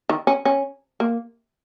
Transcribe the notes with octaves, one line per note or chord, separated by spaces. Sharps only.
D#3
C#4
C#4
A#3